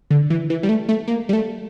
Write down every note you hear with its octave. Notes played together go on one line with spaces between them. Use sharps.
D3
E3
E3
G3
A3
A3
A#3
G3
A3